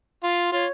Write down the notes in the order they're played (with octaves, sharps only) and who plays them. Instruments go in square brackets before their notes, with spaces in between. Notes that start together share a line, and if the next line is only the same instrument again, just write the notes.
[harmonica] F4
[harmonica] F4 [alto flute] C#5